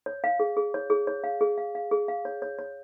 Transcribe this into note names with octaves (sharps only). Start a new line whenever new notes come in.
C#5
F5
G#4
G#4
C#5
G#4
C#5
F5
G#4
F5
F5
G#4
F5
C#5
C#5
C#5